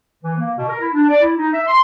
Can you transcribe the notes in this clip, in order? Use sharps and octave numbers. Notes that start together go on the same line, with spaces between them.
E3
A#3
B2
A#4
E4
D4
D5
E4
D#4
E5
C6